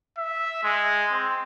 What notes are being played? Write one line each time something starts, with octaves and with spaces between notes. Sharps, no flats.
E5
G#3
C4